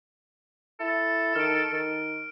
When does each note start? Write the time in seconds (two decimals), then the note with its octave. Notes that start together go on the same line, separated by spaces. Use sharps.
0.80 E4 A4
1.36 D#3 F6 D7
1.72 D#3